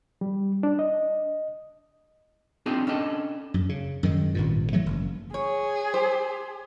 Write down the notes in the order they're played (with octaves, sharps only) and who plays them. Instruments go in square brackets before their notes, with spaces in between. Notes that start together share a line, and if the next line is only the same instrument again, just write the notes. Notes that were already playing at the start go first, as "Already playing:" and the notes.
[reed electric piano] G3
D4
D#5
[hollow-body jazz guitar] C4 D4 D#4 F4 G4 G#4
C#4 D4 A4 D#5
[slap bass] F#2
C#3
F#2 D#3 G#3
G#1 G2 A#2
E3 F#3 A3
F#1
[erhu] G#4 [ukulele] C#5
[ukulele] C5